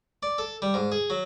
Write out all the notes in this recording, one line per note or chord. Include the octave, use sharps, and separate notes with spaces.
D5
A4
G3
G#2
G#4
F#3